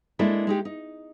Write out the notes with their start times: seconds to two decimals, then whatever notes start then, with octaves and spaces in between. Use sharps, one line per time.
0.19 G#3 A#3 D4 E4 A4
0.47 G#3 D#4 G4
0.65 D#4